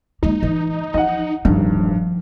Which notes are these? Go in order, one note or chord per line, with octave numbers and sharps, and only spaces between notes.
G#3 A#3 D#4
E3
F3 D#5 F#5
D1 G2 D#3 F3